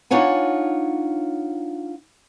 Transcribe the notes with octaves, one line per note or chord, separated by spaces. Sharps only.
D4 D#4 F4 C#5 F#5 G#5